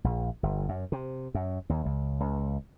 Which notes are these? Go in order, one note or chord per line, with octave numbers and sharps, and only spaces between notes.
A#1
G1
F#2
C3
F#2
D#2
C#2
C#2